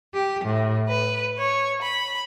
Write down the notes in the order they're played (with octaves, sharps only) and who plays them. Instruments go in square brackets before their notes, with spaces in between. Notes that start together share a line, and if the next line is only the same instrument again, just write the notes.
[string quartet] G4
A2
B4
C#5
B5